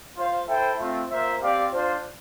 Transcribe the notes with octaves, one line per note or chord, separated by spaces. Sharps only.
F4 C5 F5
E4 A4 C5 E5 G5
A3 C4 F4
A#3 F4 C5 E5
C4 G4 D5 F5
D4 F4 C5